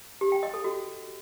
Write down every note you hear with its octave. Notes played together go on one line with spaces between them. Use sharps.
G4
G5
D#5
A4
F#4